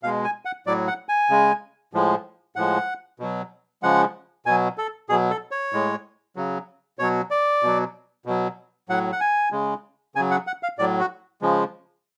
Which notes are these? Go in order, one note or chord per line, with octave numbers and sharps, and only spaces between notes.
B2 G#3 F5
G#5
F#5
A2 F#3 D5
F#5
G#5
C#3 G#3
A2 F3 G#3
A2 F3 G#3 F#5
B2 F#3
C#3 F3 G#3 F#5
B2 F#3 G#5
A4
B2 F#3 G#4
A4
C#5
A2 G#3
C#3 F#3
B2 F#3 C#5
D5
B2 F#3
B2 F#3
A2 F#3 F#5
F#5
G#5
C#3 G#3
C#3 F#3 G#5
F#5
F#5
F5
A2 F#3 D5
F#4
C#3 F3 G#3